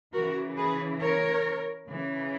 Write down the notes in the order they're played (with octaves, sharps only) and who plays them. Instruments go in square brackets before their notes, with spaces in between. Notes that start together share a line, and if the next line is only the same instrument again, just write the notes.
[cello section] C#3 E3 F#4 A#4
G#4 B4
A#4 C#5
C#3 E3